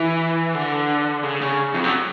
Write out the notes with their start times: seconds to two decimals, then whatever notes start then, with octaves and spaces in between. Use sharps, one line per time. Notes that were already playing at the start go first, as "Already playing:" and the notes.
Already playing: E3
0.55 D3
1.23 C#3
1.41 C#3
1.74 F2
1.84 F#2